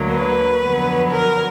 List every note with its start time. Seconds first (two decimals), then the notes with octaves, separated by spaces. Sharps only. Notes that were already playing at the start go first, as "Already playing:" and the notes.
Already playing: D2 D3 F#3 A#3
0.14 B4
0.63 F2 D3 F#3 B3
1.11 A#4